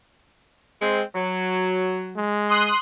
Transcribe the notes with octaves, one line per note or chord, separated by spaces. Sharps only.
G#3 C4
F#3
G#3
C6 D#6 F#6